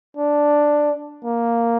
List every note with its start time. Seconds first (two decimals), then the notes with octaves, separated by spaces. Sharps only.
0.17 D4
1.24 A#3